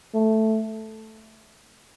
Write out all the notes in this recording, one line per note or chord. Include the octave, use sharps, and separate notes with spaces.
A3